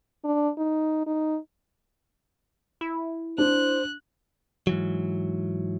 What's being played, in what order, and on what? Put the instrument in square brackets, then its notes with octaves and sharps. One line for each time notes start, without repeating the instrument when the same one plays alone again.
[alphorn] D4
D#4
D#4
[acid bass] E4
[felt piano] D4 [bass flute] C5 [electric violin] F#6
[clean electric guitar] G#2 E3 F#3